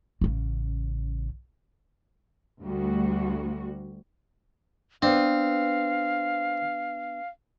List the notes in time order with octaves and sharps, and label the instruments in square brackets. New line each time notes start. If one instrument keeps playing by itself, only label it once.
[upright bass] A1 C#3
[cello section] D2 G3 F#4
[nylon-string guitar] B3 D4 [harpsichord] C4 [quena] F5